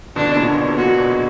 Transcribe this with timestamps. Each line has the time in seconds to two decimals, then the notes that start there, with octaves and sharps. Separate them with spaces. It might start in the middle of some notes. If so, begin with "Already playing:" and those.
0.16 B2 D3 D4
0.36 A#2 C#3
0.57 B2
0.68 B2
0.77 A#2 F#4
0.98 B2